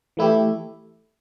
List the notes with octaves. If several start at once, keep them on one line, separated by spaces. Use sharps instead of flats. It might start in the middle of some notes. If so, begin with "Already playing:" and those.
E3 A3 E4 G4